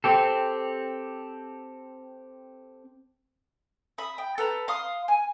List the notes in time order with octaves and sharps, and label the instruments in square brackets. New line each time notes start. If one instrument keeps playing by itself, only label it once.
[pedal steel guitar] C4 G4 A4
[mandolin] E5 B5 D#6
G5
A4 B4 A#5
F5 C6 D#6
G#5